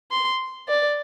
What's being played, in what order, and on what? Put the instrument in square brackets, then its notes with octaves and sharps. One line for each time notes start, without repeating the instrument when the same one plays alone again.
[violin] C6
D5